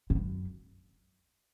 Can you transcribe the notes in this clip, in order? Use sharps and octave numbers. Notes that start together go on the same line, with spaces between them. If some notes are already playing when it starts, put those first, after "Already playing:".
G#2
F#2